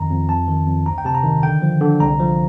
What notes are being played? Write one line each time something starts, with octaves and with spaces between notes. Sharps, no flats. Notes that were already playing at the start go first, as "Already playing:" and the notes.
Already playing: F2 D#3 A#5
F2
F2 A5
D#3
F2
D2 A#5
G5
C3 A5
A#5
D#3
D3 G5
F3
D3
C2 A#5
F3